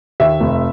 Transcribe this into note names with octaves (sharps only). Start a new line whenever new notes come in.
D#2 E5
F1